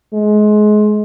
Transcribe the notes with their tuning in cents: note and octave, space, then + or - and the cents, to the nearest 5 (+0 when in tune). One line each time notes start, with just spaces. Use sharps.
G#3 +25